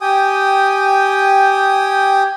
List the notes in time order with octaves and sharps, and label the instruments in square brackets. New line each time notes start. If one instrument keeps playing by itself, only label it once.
[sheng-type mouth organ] G4 G5 G#5 D#6